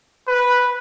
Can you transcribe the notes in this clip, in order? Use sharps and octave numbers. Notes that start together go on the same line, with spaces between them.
B4